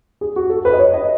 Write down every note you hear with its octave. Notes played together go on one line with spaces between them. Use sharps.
G#4
F#4
A4
B4
D#5
C#5
D#5